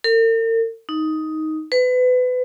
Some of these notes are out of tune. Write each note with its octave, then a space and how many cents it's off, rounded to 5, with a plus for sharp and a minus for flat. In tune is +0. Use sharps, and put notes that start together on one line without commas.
A#4 -45
D#4 +10
B4 +30